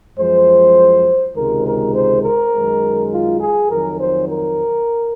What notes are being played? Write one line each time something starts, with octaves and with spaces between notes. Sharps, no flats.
F#2 F3 G#3 C5
C#2 C3 D#3 G#3 A#4
A#4
C5
A#4
F#2 D#3 G#3
F4
G#4
F2 D#3 F#3 A#4
C5
A#4